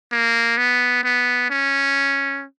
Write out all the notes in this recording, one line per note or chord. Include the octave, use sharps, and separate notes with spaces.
A#3
B3
B3
C#4